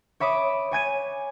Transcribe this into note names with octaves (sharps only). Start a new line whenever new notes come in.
C#5 E5 B5 D6 D#6
C#5 G#5 G#6 D#7